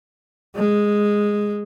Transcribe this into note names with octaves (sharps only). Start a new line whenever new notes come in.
G#3